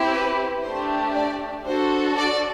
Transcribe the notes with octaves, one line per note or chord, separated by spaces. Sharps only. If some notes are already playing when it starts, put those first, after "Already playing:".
Already playing: C4 E4 G4
B4
A3 D4 G4 C5
D5
D4 F#4 A4 C5
D5